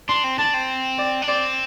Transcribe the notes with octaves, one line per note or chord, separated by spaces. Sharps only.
D4 C6
C4
D4 A5
C4
D5
D4
C4 D5